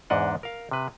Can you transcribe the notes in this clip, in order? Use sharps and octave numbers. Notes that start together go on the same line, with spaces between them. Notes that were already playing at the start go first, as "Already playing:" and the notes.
E2 G#2 D4 D#5 F#5
A#4 F5
C3 B4